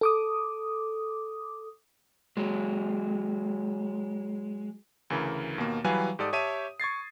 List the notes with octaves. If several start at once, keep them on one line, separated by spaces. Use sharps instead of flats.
A4 D6 D#6
F#3 G#3
D2 C#3 E3 A#4
D#2 B2 A#3
E3 F#3 G3 B4 F5 G#5
G#2 G4 A4 D5 D#6
G4 C#5 E5 A5 D#7
C#6 G#6 A6 C7